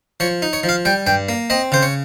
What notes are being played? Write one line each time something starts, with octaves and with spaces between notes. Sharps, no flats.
F3 C#5
D#4
C#5
F3
F5
G3 G5
G2 G5
A#3
C4 D#5
C#3 C5
C#5